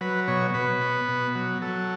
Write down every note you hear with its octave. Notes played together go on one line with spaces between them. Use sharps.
F#3 B4
B2 C#5
B2 B4
B3
B2
F#3
F#3 A4